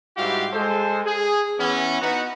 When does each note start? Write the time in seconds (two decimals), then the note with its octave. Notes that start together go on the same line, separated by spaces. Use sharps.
0.17 G#2 G3 E4 F#4 G4 F5
0.53 G#3 A4 C5
1.06 G#4
1.59 E3 B3 C#4
2.02 B3 D#4 F#4